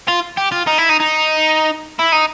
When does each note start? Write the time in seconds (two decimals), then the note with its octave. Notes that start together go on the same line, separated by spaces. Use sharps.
0.08 F4
0.37 G4
0.52 F4
0.67 D#4
0.78 E4
0.89 D#4
1.00 D#4
1.99 E4
2.12 D#4